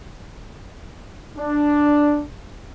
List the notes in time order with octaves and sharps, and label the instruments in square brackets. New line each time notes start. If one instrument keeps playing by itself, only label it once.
[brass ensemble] D4